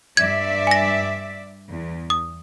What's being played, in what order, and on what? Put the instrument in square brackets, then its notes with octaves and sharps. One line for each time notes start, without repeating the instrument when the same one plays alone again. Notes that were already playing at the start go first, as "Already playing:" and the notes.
[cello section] G2 D5 E5 [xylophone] G#6
[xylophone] G#5 A#6
[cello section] E2
[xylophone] D#6